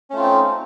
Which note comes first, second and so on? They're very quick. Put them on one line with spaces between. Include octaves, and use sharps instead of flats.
C#4 A3 F4 C4 D#4